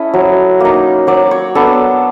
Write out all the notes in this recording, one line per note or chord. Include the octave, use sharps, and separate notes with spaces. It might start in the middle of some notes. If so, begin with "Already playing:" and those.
Already playing: A3 C#4 E4 D#5
F#3
A#3 D#4
F#3 D5
C#5
B3 D4 A4